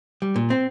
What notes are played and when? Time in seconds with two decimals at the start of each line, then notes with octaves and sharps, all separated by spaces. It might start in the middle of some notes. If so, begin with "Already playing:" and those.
0.22 G3
0.36 A#2
0.50 C4